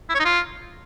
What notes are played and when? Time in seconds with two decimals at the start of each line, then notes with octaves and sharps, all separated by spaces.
0.09 E4
0.15 C#5
0.20 D#4
0.25 F4